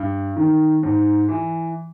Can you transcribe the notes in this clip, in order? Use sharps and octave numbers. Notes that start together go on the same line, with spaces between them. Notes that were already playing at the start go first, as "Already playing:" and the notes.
Already playing: G2
D#3
G#2
E3